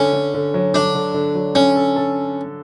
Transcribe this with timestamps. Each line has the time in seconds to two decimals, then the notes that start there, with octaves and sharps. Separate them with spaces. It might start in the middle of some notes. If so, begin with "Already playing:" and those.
Already playing: D3 C#4
0.13 D3
0.34 D3
0.54 F#3
0.74 D3 D4
0.95 D3
1.14 D3
1.35 F#3
1.55 D3 C#4
1.76 A4
1.96 A4